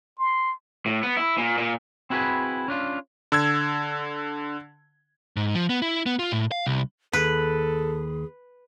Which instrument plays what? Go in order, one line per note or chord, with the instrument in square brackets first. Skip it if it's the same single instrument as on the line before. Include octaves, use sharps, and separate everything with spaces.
[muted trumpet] C6
[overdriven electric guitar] A2
B3
E4
A#2
A#2
[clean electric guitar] C4 E4 F#4 G#4 B4
C#4 D4 F4
[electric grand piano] D3 E6 G#6
[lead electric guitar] G#2
F3
B3
E4
B3
F4
A2
F5
C2
[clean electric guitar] D#2 [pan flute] G#4 [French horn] A4 [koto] B4